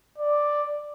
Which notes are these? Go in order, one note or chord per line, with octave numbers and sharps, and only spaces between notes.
D5